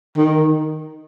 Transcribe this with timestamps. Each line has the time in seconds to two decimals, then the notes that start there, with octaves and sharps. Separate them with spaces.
0.17 D#3